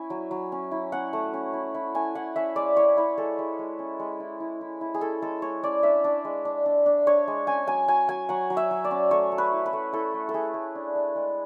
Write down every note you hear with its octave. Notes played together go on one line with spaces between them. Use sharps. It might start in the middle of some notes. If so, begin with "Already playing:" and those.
Already playing: C#4 E4 G#5
F#3
F#3
C#4
E4
C#4 F#5
A3
C#4
E4
E4
A3 G#5
E4 F#5
C#4 E5
G#3 D5
E4 C#5
E4 B4
G#3 A4
G#3
G#3
C#4
G#3
E4
E4
E4
E4
G#4
C#4 A4
G#3 A4
G#3 C#5
C#4 D5
D4 E5
D4
G#3
D4
D4
D4
D4 C#5
G#3
C#4 G#5
F#3 G#5
F#3 G#5
F#3 G#5
F#3 F#5
F#3
E5
F#3
D5
C#4
A3 C#5
A3
B4
E4
B4
A3
E4 A4
A3
A4
A3 G#4
A3
D4
D4
G#3